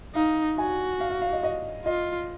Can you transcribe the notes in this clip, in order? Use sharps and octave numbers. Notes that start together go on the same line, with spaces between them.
D#4 F5
F#4 G#5
F5
F5
F5
D#5
D#5
F4 D#5